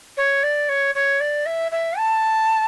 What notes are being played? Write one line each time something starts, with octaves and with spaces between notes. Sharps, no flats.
C#5
D5
C#5
C#5
D5
E5
E5
A5